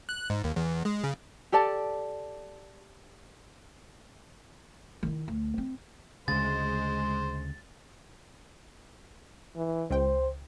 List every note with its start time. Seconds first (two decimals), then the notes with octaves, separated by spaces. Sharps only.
0.09 F#6
0.30 G#2
0.44 D#2
0.56 E2
0.85 G#3
1.04 C#3
1.52 G4 A4 D5 A5
5.03 D#3 E4
5.28 D2
5.58 C4
6.28 D2 C#3 G#3 C5 A6
9.56 E3
9.91 C#2 C5 G5